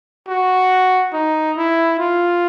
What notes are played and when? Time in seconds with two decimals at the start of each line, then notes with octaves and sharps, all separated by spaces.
0.28 F#4
1.13 D#4
1.57 E4
1.99 F4